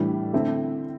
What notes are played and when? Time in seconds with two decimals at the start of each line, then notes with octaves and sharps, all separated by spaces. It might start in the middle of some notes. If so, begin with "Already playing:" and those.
Already playing: A2 E3 G3 D4
0.33 D3 A3 C4 E4